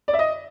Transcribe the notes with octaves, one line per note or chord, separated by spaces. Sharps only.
D5
E5
D#5